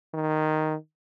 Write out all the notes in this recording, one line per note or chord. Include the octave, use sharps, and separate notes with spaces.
D#3